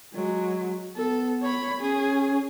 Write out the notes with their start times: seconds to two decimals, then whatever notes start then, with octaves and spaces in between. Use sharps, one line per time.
0.14 F#3 G#3
0.96 B3 A4
1.43 C#5 B5
1.80 C#4 G#4